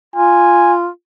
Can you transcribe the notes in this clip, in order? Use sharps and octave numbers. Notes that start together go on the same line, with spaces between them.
F4 G#5